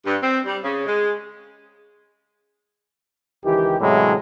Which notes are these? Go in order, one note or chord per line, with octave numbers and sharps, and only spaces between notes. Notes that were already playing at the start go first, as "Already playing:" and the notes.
G2
C4
G3
C#3
G#3
C#2 D#3 E3 G4
E2 A2 C3 F#3 G#3 E4